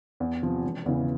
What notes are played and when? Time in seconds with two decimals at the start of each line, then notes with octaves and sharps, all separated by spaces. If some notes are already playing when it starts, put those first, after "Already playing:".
0.20 E2
0.42 C3 F3
0.64 E1
0.86 E2 C#3 E3